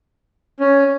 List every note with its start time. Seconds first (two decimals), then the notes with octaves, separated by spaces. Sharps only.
0.60 C#4